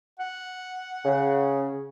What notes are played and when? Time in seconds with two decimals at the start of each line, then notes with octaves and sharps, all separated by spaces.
0.20 F#5
1.05 C#3